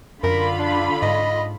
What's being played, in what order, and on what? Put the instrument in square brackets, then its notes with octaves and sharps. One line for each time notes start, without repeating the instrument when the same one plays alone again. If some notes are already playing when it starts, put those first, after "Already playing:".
[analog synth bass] F#2 [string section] D3 F4 B5 [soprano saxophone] A#4
[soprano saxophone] D4
[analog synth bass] G#2 [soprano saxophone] D#5